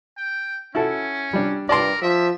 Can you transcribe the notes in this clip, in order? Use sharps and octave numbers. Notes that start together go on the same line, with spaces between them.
G5
C#4 E4 F#4 A4
G3 D4
G2 A#4 D5 A5 C6
F3 E5